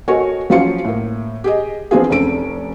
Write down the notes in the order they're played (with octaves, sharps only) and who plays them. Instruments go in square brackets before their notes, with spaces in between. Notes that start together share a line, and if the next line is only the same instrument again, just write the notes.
[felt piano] F#4 A4 A#4 C#5 D#5 G#5
F3 F#3 C#4 F4 C#7
A2 A#3
G4 G#4 D#5
F3 B3 C4 D4 F4 G#4
F1 C4 C#4 A4 D7